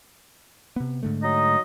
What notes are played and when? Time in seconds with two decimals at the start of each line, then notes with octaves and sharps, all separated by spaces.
0.76 C3 B3
1.03 G#2 D3 A3
1.23 F#3 D#4 D#5